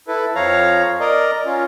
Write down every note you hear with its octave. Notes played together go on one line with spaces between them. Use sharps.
E4 A4 B4
F2 F3 C#5 F5 A#5
A#4 D5 D#5 A#5
C#4 F4